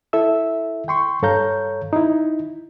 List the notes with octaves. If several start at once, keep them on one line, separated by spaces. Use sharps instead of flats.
E4 A4 E5 E6
G5 C6 C#6
G2 A4 C#5 F5 A#5 G6
D#4 E4